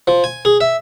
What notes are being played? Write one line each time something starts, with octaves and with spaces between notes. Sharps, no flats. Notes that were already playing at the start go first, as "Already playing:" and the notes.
F3
G#5
G#4
E5